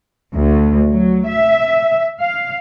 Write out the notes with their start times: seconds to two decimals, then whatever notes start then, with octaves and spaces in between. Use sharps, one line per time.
0.33 D2
0.92 F#3
1.28 E5
2.20 F5